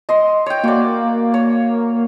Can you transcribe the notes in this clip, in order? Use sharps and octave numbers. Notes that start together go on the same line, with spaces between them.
D#5 C6
C#5 G5
A#3 F#4 D5
C#5